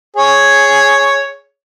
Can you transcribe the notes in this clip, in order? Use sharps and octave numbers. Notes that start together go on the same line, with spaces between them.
G#4 C#5